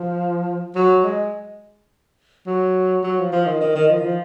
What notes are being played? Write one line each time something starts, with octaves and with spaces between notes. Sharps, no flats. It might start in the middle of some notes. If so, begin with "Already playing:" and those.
Already playing: F3
F#3
G#3
F#3
F#3
F3
F3
D#3
D#3
D#3
F3
D#3
F3